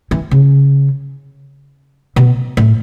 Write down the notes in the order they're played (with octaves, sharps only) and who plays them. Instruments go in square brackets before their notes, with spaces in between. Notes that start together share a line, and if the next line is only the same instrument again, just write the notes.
[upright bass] E3
C#3
B2
A2